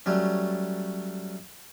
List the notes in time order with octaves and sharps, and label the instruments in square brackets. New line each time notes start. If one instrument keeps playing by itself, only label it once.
[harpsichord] F#3 G3 A3 C#4